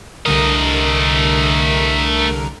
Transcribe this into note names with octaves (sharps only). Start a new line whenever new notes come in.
C2 D3 A3 A#4 D#5